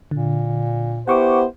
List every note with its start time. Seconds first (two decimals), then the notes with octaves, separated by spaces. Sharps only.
0.11 A#2 D3
1.08 B3 E4 G4 C5 F#5 C#6 D6